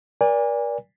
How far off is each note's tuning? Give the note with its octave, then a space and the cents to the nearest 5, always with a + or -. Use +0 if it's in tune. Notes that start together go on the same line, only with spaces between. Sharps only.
A#4 +40 D5 -15 G#5 -30